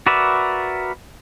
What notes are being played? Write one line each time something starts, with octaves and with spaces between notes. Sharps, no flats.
F#4 A#4 B4 D5 E5